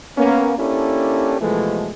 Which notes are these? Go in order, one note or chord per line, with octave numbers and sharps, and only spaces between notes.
A#3 B3 C#4
A#3 C#4 D4 E4 G4 A4
B2 E3 F3 G#3 A3